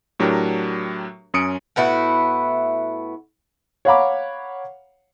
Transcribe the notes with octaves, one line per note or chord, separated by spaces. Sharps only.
A2 F#3 D4 G4 A#4
F#2 C#4 D#6 C#7 D7
A2 B3 E4 F#4
C#5 F5 F#5 A#5 B5 D6